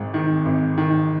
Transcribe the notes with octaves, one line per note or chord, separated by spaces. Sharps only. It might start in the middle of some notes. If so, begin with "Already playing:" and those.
Already playing: G#1 G#2
D#3
G#1
D#3